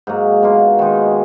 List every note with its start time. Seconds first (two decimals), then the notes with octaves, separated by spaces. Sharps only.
0.07 G#2 F#3 A#3
0.43 B2 A#3 F4
0.79 D#3 G#3 D#4